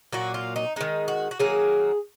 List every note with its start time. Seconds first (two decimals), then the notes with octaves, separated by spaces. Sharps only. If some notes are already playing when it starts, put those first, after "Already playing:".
0.13 A#2 F#3 A#3 F#4
0.34 F4
0.56 D#4
0.76 D#3 G#3 D#4
1.08 F#4
1.31 F#4
1.40 D#3 F#3 A#3 G#4